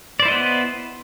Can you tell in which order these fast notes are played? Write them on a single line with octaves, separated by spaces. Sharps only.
D5 C5 E4 D#5 B3